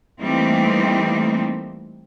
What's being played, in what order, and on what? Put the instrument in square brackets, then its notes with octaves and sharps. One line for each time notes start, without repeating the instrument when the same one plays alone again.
[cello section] E3 G3 A3 A#3 C4 D#4